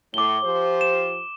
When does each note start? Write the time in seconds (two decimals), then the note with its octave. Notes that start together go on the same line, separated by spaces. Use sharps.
0.14 A2 D6 G7
0.43 F3 G4 C5
0.81 E7